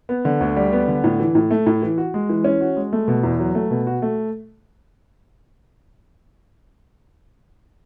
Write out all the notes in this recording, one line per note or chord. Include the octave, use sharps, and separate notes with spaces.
B3
D3
D2
G3
B3
D3
A2
E3
A2
A3
A2
E3
F#4
G#3
E3
C#4
F#4
G#3
A3
B2
E2
F#3
A3
B2
F#4
A3